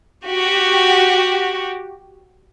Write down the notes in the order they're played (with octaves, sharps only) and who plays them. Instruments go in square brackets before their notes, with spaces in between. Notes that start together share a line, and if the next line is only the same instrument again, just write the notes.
[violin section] F#4 G4